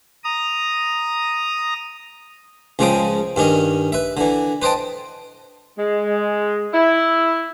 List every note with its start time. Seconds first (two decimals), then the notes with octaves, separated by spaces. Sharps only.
0.24 A#5 D#6
2.79 C#2 C#3 F3 G#3 G5 D#6
3.36 G2 D#3 C#4 D#5
3.92 B4 E5
4.17 D3 E3
4.62 B4 C5 D#5 G5 A5
5.77 G#3
6.73 E4